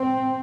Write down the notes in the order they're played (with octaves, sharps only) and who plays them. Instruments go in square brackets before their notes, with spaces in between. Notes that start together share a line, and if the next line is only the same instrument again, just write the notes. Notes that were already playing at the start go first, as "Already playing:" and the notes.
Already playing: [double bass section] C4